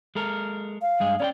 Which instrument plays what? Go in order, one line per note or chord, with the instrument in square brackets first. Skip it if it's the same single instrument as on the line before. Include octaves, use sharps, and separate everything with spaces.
[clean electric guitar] G#3 A4 A#4
[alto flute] F5
[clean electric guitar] G2 G#3 G#4
[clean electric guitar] C#4 A#4 G5 [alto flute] D5